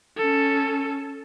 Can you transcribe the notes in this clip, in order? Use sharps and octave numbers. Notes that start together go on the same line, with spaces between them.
C#4 A4